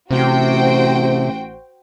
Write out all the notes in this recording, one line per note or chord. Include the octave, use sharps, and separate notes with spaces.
A1 C3 F#4 C5 G5